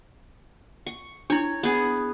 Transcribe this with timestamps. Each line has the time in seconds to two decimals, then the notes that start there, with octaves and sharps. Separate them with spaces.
0.86 C#6
1.30 D4 E4 C#5
1.63 B3 G#4